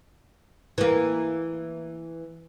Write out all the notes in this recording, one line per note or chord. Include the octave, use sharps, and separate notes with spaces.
E3 A#3